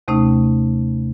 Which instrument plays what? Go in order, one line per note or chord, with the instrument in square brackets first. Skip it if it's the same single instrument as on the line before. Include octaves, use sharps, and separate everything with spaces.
[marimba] D#2 C3 A3 C#4 D#4